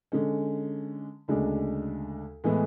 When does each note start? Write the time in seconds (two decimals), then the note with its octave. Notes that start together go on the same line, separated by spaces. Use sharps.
0.12 D3 G#3 C#4
1.28 D2 C#3 G#3 D4
2.44 A2 E3 G#3 B3 E4